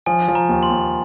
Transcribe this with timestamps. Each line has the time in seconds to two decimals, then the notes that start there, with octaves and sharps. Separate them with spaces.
0.06 F3 G#5
0.28 F3
0.35 A#5
0.49 D#2
0.63 C6
0.70 D#2